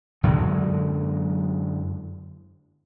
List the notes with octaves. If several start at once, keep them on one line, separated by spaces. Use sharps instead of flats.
F#2 D3 F#3 G#3